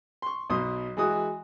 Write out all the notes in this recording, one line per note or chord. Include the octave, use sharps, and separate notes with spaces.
C6 C#6
B1 B2 C6 D#6
E3 G#3 F#4 D#6